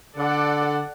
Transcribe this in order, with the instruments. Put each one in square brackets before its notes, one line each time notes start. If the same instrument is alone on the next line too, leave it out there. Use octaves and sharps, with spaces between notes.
[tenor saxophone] D3 [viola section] A4 D5 F#5